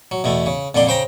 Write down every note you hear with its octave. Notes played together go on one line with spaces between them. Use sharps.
F#3
E2 B2 A3
C#3
F2 A#2 D3 D5 C6
C#3 C5 G5 A#5